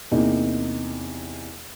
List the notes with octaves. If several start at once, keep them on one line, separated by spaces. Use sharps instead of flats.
E2 C3 A#3 D#4